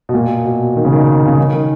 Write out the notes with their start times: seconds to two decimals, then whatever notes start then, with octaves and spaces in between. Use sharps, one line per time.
0.09 B2
0.14 A#2
0.45 B2
0.76 D#3
0.85 C#3
0.92 D#3
1.26 C#3
1.37 D#3
1.53 D#3